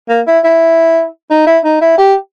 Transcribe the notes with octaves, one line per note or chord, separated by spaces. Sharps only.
A#3
E4
E4
D#4
E4
D#4
E4
G4